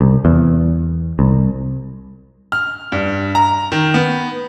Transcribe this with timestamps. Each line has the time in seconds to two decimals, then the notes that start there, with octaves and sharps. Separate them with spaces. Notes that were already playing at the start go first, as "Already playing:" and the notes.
0.01 C2
0.25 E2
1.19 C2
2.52 F6
2.92 G2
3.35 A#5
3.72 D#3
3.94 B3